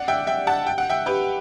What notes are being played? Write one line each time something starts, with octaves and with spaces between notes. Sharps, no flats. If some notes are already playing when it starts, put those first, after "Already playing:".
Already playing: D5 F#5
E5 G5
E5 G5
F#5 A5
G5
F#5
E5 G5
G4 B4